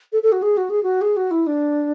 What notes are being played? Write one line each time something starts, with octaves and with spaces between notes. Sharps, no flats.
A4
A4
F#4
G#4
F#4
G#4
F#4
G#4
F#4
E4
D4